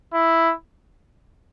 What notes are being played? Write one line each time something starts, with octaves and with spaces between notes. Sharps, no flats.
E4